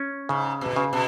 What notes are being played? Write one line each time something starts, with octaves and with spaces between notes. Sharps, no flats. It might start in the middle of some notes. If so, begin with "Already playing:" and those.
Already playing: C#4
G#2 C#3
B2
C#3
B2